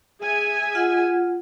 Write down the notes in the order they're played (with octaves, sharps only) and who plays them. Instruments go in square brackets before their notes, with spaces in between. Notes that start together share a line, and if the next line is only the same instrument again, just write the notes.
[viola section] G#4 E5 G#5
[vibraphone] F4 F#5